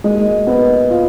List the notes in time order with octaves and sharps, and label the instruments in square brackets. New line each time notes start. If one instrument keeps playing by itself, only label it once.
[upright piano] G#3 [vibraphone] A#3 D#4 F#4 A#4 D#5
[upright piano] B3
F4